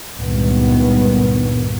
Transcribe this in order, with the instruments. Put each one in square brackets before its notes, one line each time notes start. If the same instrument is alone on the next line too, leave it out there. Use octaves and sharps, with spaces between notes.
[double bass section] C#2 G2 A#2 D#3 B3